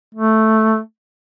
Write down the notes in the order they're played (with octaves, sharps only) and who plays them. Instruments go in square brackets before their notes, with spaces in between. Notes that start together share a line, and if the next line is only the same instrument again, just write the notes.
[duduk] A3